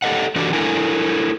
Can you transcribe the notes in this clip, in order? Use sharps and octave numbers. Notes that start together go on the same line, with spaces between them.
G4 A4 D5 D#5 F#5
E3 D4 F#4 G4 A4 D5
A3 D4 E4 A4 A#4 G#5